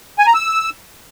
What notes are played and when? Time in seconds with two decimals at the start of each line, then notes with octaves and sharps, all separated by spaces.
0.19 G#5
0.26 A#5
0.34 E6